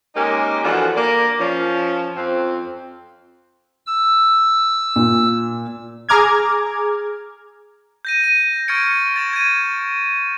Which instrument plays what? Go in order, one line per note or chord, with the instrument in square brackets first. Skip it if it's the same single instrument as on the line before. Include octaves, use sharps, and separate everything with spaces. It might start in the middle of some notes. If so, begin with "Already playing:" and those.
[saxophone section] G#3 A#3 C#4 D#4 G4 A#4
E3 F3 D4 F4 F#4 A4
A#3 D5
F3 C#4
F2 C4
[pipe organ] E6
[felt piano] A#2
[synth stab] G#4 A#5 D6 F6 G#6
[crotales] G6 A#6 D#7
D#7
C#6 F6 G#6 A6 C#7 D7
A6 E7
G#6 D#7